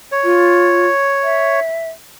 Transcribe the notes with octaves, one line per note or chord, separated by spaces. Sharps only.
C#5
F4
E5